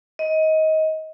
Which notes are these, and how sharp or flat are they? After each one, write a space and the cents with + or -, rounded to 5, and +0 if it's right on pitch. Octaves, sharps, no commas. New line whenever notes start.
D#5 +20